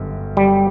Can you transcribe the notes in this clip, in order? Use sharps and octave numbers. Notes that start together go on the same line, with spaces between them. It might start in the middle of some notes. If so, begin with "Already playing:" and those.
Already playing: G1 F#2 F#3
G3